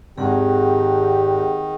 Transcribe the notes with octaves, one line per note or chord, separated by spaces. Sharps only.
G#1 D#3 G4 G#4 F#5